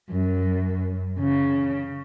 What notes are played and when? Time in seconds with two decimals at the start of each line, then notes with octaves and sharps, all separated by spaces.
0.10 F#2
1.19 C#3